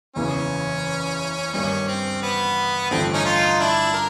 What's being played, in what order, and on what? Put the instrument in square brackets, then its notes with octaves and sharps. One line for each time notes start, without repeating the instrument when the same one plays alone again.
[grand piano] F#1 E2 C#3 E3 [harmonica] C#4
[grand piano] G2 D#3 G3 [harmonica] C#4
[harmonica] C4
B3
[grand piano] A1 G2 D3 F3 A3 [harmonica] C4
[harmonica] C#4 D#4
D#4 F4
D4 E4
A#4